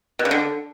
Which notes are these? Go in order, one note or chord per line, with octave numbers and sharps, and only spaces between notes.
B2
C#3
D3